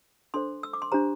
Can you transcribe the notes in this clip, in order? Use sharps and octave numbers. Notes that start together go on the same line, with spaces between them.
D4 A4 C5 C6
E6
D6
C6
D4 G4 C5 A#5